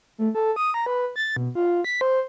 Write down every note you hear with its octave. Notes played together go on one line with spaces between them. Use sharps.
A3
A4
D#6
A#5
B4
A6
B2
F4
B6
C5